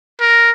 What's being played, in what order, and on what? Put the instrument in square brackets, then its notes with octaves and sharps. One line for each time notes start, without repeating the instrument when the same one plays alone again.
[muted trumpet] A#4